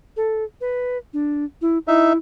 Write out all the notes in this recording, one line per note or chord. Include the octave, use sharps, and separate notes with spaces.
A4
B4
D4
E4
D#4 E4 E5